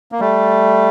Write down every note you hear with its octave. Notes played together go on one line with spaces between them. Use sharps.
A#3
G3 A3